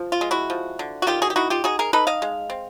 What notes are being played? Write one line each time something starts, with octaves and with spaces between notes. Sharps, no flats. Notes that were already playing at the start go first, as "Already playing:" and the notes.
Already playing: F3
F4
G#3
E4 F#4
F3
D3
F#4
D#3 F4 G4
F#4 G#4
G4
D#4 E4 F#4
F4 G4
D#4 F#4 G#4
G#4 A#4
D#4 A4 B4
D#5 F5
G#3
C4